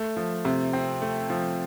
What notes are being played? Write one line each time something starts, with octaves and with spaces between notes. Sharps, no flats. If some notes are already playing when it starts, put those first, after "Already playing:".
Already playing: A3
F3
C3
C4
A3
F3